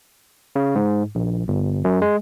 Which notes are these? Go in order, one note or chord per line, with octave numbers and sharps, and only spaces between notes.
C#3
G#2
A#1
G1
F#2
G#3